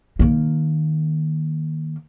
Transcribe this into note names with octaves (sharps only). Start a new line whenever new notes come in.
D#3 A#3